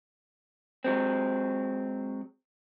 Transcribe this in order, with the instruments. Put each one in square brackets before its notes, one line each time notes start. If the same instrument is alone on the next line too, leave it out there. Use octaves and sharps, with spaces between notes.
[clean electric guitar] F#3 G#3 C4